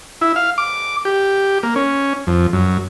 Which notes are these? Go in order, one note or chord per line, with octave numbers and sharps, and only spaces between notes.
E4
F5
D6
G4
A#3
C#4
F2
F#2